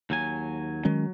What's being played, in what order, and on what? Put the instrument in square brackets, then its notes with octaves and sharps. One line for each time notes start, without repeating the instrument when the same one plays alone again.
[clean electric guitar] D#2 F#3 G#5
[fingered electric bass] D#3 G#3 C#4 [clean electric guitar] F#3